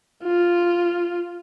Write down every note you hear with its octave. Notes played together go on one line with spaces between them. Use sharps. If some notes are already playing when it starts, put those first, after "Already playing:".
F4